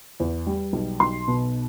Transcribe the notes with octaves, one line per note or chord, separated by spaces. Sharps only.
E2
G3
B1
B1 C6
B2